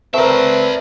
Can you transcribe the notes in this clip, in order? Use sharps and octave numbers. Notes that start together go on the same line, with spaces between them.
A3 C4 A#4 B4 D5 E5